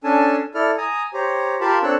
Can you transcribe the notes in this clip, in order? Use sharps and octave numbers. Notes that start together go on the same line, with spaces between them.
C#4 D4 A4 G#5 A5
E4 A4 D5 F6
G#5 A#5 D#6
G4 C5 C#5 A#5
F4 G4 A#4 F5 A5 B5
C4 D4 A4 C#5 E6 F#6